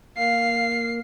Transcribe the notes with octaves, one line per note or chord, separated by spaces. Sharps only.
A#3 A#4 F5 C7